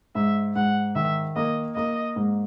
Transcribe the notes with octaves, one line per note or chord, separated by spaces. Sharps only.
G#2 E5
G#2 F#5
D#3 E5
A#3 D#5
A#3 D#5
G#2